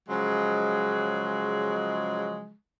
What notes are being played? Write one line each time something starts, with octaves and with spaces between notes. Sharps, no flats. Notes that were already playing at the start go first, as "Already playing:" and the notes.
C#3 F3 F#3 G#3